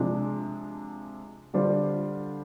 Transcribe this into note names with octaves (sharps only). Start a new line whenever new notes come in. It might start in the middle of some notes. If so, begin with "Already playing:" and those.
Already playing: C3 F3 G#3 D4
D3 G3 D4 F4 C5